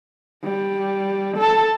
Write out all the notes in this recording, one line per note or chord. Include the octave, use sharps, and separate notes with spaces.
G3
A4 A5